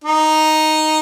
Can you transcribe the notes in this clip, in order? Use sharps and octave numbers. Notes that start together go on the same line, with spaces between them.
D#4